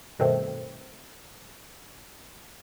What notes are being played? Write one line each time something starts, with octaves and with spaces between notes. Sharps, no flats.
G2 B2 D#3 A3 C4